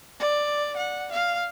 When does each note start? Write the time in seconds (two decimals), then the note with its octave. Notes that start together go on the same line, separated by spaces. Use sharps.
0.20 D5
0.76 F#5
1.11 F5